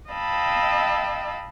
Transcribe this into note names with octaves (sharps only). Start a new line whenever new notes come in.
D#5 F5 G5 A5 B5 E6